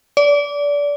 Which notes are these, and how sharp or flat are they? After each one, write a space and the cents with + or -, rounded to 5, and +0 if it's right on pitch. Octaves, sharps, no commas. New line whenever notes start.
D5 -25